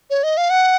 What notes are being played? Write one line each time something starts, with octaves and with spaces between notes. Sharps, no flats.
C#5
D#5
F5
F#5